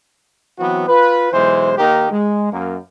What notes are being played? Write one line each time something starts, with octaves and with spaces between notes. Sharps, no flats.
E3 F#3 B3 C4 F#4
F4 B4
B1 E3 G#3 C5
D#3 A#3 D#4 G4 A#4
G#3
F#2 A#3